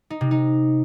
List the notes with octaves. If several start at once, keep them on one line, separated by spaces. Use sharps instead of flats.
D#4
C3
D#4